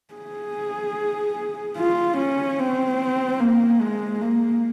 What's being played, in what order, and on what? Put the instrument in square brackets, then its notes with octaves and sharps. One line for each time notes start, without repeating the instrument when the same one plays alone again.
[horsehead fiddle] G#4
F4
C#4
C4
A#3
G#3
A#3